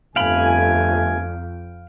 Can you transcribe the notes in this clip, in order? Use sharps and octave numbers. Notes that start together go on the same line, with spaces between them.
G1 F2 A3 F5 G5 G#5 B5